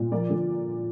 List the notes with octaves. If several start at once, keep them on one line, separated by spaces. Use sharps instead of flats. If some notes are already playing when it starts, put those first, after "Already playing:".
Already playing: A#2
F3 A#4 D5
D3